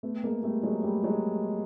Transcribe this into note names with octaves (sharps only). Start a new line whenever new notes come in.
A3 B3
G#3 A#3
G3 A3
F#3 G#3
G3 A3
F#3 G#3